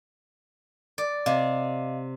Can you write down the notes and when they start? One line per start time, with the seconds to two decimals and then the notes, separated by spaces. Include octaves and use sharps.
0.98 D5
1.26 C3 D#5 F5